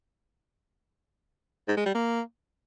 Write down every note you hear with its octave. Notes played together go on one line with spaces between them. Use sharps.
G#2
G#3
G3
A#3